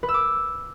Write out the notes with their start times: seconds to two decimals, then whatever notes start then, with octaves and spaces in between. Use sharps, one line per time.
0.03 B4
0.09 E6
0.14 D6